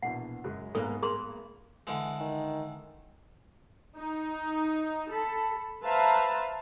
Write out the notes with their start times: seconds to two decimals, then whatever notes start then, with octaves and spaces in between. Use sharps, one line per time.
0.03 A#1 E2 B2 F#5
0.44 F#2 C#3 G#3
0.75 G#1 G#2 A#3 B3 A4 B4
1.03 A#3 G#4 C6
1.87 D3 E3 G#3
2.20 D#3
3.97 D#4
5.10 A4 B5
5.84 B4 C5 E5 F5 A5 A#5